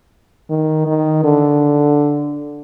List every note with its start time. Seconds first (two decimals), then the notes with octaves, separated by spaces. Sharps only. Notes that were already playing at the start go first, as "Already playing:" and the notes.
0.50 D#3
0.87 D#3
1.24 D3